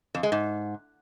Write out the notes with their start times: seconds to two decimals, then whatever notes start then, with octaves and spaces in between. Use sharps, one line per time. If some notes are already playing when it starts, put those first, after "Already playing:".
0.15 F2
0.23 G#3
0.32 G#2